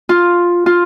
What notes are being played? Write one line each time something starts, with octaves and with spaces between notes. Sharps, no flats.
F4
F4